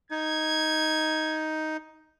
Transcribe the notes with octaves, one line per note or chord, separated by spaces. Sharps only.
D#4 G#6